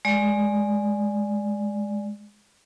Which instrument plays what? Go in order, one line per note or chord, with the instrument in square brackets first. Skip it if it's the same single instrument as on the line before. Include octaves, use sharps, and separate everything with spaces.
[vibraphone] G#3 D5